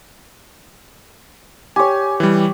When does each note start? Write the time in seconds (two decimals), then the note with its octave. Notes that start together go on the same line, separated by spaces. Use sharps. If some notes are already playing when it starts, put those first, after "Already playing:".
1.76 G4 C#5 G#5
2.20 E3 G3